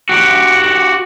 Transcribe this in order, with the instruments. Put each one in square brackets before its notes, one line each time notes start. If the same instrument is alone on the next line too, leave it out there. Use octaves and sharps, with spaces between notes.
[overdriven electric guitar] F#4 G4